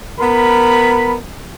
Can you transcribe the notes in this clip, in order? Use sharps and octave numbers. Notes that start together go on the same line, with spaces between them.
B3 A#4 B5